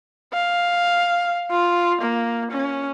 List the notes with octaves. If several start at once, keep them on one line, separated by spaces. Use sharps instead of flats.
F5
F4
A#3
C#4